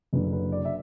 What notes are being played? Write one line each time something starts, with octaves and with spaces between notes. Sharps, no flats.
F#1 F#2 D3 B4
B4
D5
E5